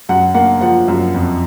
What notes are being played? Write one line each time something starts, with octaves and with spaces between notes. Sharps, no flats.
F#2 F#5
A#3 F#5
F3 F#5
F#2
F2